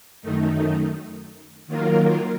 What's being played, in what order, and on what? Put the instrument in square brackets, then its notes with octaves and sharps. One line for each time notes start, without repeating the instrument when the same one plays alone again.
[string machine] F#2 D#3 A3 D#4
D#3 F#3 A#3 F4 A#4